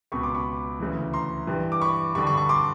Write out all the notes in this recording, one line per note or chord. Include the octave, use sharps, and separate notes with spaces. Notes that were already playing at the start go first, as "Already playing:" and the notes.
C#2 B2 B5 C#6
C6 D6
B5 C#6
D2 C#3 E3
A#5 C6
G2 E3
D6
B5 C#6
G2 D3 B5 C#6
B5 C#6
B5 C#6
C6 D6